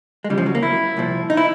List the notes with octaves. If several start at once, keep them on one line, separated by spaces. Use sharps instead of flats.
G#3
C#2 C#3 E3 G3
F3
F#3
A#3
E4
C2 A#2 F3
D#4
E4